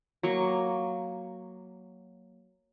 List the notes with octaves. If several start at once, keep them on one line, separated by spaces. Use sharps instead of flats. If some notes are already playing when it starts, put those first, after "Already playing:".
F#3 A#3 C#6